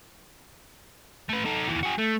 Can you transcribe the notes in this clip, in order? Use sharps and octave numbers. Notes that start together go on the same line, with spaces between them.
A3 B4
D#4 A4
D#2 E3
F#4 G#4
A3